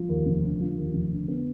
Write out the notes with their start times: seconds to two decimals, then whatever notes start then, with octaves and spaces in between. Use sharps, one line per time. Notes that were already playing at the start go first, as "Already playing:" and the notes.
Already playing: F3
0.09 D#2
0.26 F1
0.43 D3
0.61 F3
0.77 D#2
0.94 F1
1.11 D3
1.28 B3